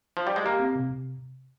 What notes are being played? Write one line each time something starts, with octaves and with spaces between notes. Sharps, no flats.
F3
G3
G#3
A#3 G4
C4
C3
C3